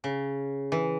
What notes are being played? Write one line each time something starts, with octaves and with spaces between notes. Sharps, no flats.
C#3
E3